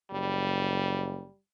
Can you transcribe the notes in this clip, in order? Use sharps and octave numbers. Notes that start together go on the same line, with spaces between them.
F#1 G3